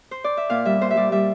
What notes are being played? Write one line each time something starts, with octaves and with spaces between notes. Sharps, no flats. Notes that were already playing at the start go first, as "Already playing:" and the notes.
Already playing: A#4
C5
D5
E5
A#2 F5
G3 E5
A#2 C5
E5
G3 D5
G3 E5